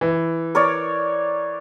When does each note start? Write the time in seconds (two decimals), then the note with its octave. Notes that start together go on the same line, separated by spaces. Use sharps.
0.01 E3
0.55 A#4 C#5 D5